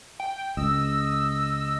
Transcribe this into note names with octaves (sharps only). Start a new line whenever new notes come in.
G5
C#2 D#5 E6